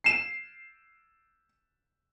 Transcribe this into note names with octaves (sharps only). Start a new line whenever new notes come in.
C7 E7